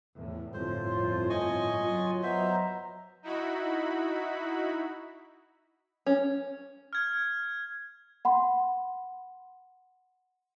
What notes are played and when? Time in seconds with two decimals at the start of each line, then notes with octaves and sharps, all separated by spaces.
0.15 E2 A2
0.53 G1 F2 A2 F4 C5 C#5
1.30 D#5 G#5 C#6
1.80 F#3 F4
2.23 B3 C5 D#5 E5 A#5
3.23 D#4 E4 F#4 B5
6.06 C#4
6.93 F6 G#6
8.25 F#5 B5 C6